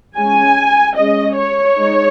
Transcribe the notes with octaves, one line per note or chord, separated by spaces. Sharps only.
G#3 C#4 G#5
G#3 C#4 D#5
C#5
G#3 D#4